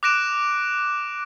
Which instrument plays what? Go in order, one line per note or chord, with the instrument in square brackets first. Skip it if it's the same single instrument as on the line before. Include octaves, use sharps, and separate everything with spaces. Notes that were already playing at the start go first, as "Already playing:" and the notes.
[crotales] D6 F#6 A#6 D7 E7